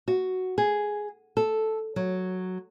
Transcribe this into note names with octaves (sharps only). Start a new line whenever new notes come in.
F#4
G#4
A4
F#3